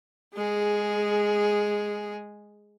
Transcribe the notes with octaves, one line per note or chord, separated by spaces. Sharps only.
G#3 G#4